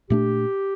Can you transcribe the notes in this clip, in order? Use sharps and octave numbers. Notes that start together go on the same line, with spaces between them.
A#2 A3 D4 G4